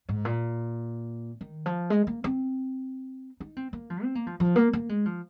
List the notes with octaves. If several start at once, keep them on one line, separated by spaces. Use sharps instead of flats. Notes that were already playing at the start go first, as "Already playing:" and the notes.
G#2
A#2
D#3
F3
G#3
A#3
C4
D#4
C4
A#3
F3
C4
A#3
F3
F3
A#3
A#3
G#3
F3